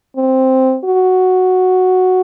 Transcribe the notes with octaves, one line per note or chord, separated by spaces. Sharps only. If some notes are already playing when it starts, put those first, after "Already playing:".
C4
F#4